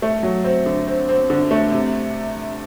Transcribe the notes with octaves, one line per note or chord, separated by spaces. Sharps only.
A3
F#3
C4
D3
C4
C4
D3
A3
C3